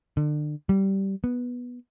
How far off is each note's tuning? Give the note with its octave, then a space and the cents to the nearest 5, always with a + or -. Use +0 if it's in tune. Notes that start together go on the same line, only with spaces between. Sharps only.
D3 +35
G3 -15
B3 -10